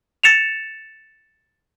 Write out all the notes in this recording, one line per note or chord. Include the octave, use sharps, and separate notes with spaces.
A6 C#7 E7 F7